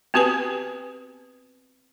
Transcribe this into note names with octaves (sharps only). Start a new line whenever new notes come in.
B3 C4 F#4 G4 B4 G#5